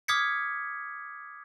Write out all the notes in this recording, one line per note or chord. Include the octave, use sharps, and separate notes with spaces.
D6 D#6 F6 G#6 B6 C#7